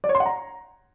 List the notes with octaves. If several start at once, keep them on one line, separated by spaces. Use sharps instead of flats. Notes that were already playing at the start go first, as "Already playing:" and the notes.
D5
C#5
C6
F#5
A#5